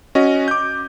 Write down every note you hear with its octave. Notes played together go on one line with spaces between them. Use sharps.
C#4 F#4 D#5
D6 G6